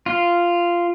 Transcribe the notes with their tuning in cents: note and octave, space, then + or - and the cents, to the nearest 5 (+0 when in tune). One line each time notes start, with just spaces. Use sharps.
F4 -10